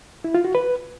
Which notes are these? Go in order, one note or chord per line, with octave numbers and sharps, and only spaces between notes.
E4
F4
F#4
B4